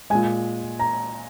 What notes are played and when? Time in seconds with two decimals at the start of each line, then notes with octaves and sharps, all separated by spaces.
0.10 A#2 G#3 G#5
0.79 A#5